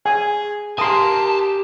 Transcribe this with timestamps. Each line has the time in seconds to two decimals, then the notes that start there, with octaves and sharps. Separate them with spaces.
0.06 G#4 G#5
0.78 G4 A#4 G#5 A5 C6 D#6